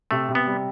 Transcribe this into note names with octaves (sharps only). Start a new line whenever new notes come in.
C3 A3
C3
B3
G3